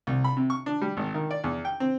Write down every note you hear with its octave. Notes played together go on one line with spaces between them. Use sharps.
C2
B5
C3
C#6
D4
G3
G#1
D#3
D5
E2
G5
C4